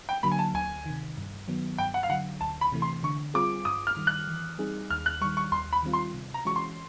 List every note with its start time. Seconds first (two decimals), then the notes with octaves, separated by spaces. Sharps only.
0.09 G5
0.23 D3 F#3 A#3 B5
0.32 G#5
0.39 A5
0.54 D2 G#5
0.86 C3 D#3
1.18 G2
1.48 D#3 F#3 B3
1.78 G2 G5
1.94 F#5
2.03 F5
2.10 D3 F#3 F#5
2.41 D2 A5
2.61 B5
2.72 C3 E3 A3
2.82 C6
3.03 D3 C#6
3.34 G3 C4 F4 G#4 D6
3.65 G2 D#6
3.87 F6
3.97 D#3 G3
4.07 F#6
4.28 E3
4.58 G3 C4 D#4 G#4
4.90 D#2 F6
5.06 F#6
5.21 G3 C#6
5.24 D#3
5.37 C#6
5.51 D#2 C6
5.73 B5
5.83 D#3 G3 C4 F4
5.93 C6
6.14 C3
6.34 A#5
6.45 E3 G#3 C#4 F#4 C#6
6.56 C6